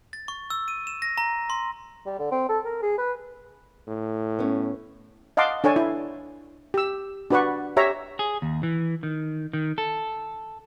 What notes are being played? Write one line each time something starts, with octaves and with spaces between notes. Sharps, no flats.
A6
C#6
E6
D#7
E7
A#6
A#5
C6
G3
D3
C4
A4
A#4
G#4
B4
A2
B3 C#4
D#5 F5 F#5 A5 C6 D6
D4 A4 C#5 G#5 A5
E4
G4 E6
D4 F#4 B4 D5 F#5 C#6
G4 C#5 E5 A#5
G#4
D#2
E3
D#3
D#3
A4